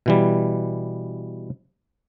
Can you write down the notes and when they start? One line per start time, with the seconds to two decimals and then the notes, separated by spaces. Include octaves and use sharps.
0.06 B2 E3 G3